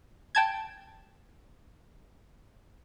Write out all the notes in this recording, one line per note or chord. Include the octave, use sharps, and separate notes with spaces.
G5 A5 G#6